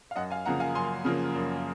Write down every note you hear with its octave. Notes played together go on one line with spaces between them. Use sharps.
F5
F#2 D#5 F#5
F5 G#5
C#3 F3 A#3 F#5 A#5
F5 G#5
F#2 G#5 C6
C#3 F3 A#3
F#2